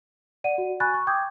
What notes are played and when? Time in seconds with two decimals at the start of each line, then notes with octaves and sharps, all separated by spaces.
0.44 D5 F#5 D#7
0.58 F#4
0.80 G#5 B5 C#6 F#6 A6
0.94 C#6
1.07 G5 D6 D#6 G6 G#6